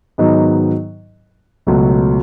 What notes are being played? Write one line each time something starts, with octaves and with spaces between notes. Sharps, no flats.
G#2 D#3 F#3 B3 D#4
C#2 B2 F#3 A3